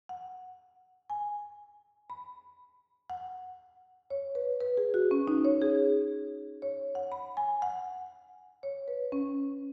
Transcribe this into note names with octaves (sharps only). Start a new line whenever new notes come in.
F#5
G#5
B5
F#5
C#5
B4
B4
G#4
F#4
C#4
D#4
C#5
G#4
C#5
F#5
B5
G#5
F#5
C#5
B4
C#4